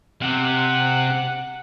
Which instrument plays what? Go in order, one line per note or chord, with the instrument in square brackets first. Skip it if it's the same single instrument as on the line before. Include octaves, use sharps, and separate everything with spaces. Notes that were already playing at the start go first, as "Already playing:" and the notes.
[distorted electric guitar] C3 [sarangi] F#5